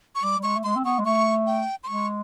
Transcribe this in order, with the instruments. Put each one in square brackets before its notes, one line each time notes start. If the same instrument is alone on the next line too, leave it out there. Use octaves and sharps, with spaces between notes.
[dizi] C#6
[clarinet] G3 [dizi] D6
[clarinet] G3
[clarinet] G#3 [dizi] C#6
[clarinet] A3
[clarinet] G#3 [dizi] C6
[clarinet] C4
[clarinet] B3 [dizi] C#6
[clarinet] G#3
[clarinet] A3 [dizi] C#6
[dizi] G5
C6
[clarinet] G#3 [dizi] C#6